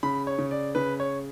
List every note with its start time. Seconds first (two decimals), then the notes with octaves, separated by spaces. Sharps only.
0.03 C#3 B5
0.27 C#5
0.39 C#3
0.51 D5
0.75 C#3 B4
1.00 C#5